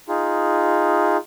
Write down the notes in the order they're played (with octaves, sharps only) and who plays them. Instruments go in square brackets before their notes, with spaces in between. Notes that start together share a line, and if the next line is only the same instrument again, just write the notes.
[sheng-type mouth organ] D#4 F4 G#4